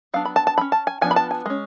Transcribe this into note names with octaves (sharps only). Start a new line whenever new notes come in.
F#3 B3 D4 F5
B5
A5
A5
F#3 C#4 B5
A5
G#5
F3 B3 D4 G#5
B5
A5
G#5
G#3 C#4